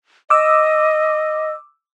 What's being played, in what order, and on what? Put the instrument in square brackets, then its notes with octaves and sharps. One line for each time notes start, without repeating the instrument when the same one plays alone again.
[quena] D#5 [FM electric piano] D6 E6